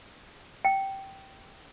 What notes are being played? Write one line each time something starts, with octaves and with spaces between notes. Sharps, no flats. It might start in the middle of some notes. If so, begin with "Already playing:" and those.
G5